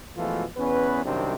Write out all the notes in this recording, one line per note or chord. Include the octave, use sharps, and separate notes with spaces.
B2 E3 F3 G#3 A3 F4
E2 B3 C#4 B4
C2 F#2 C3 D#3 C4 D4